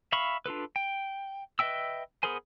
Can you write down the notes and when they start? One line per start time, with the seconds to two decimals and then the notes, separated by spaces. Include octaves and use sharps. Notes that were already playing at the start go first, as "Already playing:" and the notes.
0.12 E5 F5 B5 C#6
0.46 D4 F4 A4 B4
0.76 G5
1.59 B4 D#5 E5 G5 E6
2.23 B3 G#4 A#4 C5 G#5